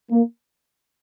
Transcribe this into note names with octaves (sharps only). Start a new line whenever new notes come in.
A#3